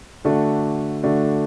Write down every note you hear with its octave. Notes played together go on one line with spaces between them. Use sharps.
D3 A3 D4 F#4
D3 A3 D4 F#4